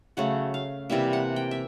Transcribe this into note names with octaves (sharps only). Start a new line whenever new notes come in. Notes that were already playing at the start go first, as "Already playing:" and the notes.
C#3 F#3 A3 F#5
F5
C3 E3 G3 A#3 E5
F#5
G5
E5